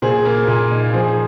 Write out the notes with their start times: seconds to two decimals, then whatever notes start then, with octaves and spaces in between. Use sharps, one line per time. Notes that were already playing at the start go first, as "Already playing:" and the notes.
0.02 A#2 G#4 C5
0.25 A#3
0.47 A#2
0.71 D#4
0.93 F3 G#4 C5